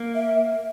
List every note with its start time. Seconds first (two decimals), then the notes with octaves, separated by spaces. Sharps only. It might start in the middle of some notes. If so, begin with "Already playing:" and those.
Already playing: A#3
0.15 E5